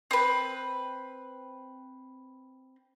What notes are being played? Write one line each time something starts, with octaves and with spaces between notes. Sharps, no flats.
C4 B4